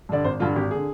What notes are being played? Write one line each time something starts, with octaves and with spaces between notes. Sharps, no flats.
G2 D3 D5
G#1 C5
G2 D3 F4
G#1 G4
D3 G#4